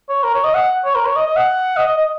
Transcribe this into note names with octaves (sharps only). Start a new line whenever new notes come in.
C#5
A#4
C#5
D#5
F#5
C#5
A#4
C#5
D#5
D#5
F#5
D#5
D#5
D#5